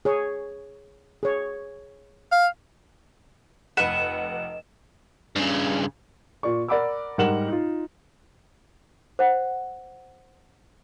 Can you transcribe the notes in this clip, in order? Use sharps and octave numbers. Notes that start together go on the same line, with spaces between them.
G#4 C#5
G#4 C#5
F5
F1 B4 D#5 F#5 F#6 E7
G2 C#3
A#2 D5 C#6
A#4 D5 F#5 B5 D6 E6
G#2 G3 A#4 F#5 E7 F#7
D#4 F4
C5 F#5